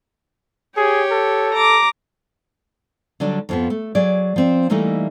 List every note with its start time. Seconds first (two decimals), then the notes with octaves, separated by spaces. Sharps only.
0.77 G4 G#4 C#5
1.11 A4
1.53 A#5 D6
3.20 D3 F#3 G3 D4
3.49 F2 F3 B3
3.70 A3
3.95 F#3 G#4 D5
4.36 F3 C4
4.70 E3 G3 A3 A#3 D#4